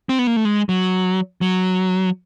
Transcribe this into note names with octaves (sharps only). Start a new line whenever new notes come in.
C4
B3
A#3
A3
G#3
F#3
F#3